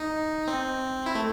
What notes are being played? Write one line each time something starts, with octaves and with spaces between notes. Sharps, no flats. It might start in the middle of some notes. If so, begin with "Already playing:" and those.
Already playing: D#4
C4
E4
A3